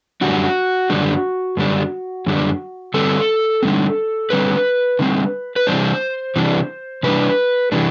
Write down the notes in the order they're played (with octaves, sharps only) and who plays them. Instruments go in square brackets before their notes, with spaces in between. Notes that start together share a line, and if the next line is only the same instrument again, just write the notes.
[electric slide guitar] F#2 D3 G3 D4 F#4
F#2 D3 G3 D4
F#2 D3 G3 D4
F#2 D3 G3 D4
D3 G3 C4 A4
D3 G3 C4
D3 G3 C4 B4
D3 G3 C4
B4
C3 E3 G3 D4 C5
C3 E3 G3 D4
C3 E3 G3 D4 B4
C3 E3 G3 D4